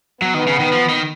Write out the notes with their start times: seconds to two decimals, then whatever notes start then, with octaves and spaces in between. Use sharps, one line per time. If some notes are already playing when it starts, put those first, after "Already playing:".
0.21 F#3 B3
0.34 D#3
0.47 C#3
0.60 D#3
0.73 F3
0.89 D#3